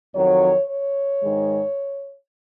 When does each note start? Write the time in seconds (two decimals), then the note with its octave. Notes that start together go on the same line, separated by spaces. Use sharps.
0.14 F2 D#3 F#3 C#5
0.69 C#5
1.22 G#2 D#3 G#3